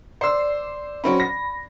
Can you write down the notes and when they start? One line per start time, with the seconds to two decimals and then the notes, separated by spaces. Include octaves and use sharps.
0.21 C5 D5 E6 C7
1.04 F#3 C4 C#4 B5
1.20 A#6